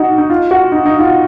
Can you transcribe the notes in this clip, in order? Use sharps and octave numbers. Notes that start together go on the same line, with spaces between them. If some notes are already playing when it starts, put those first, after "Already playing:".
Already playing: D#4 F#4
D#4
F4
F#4
D#4
D#4
F4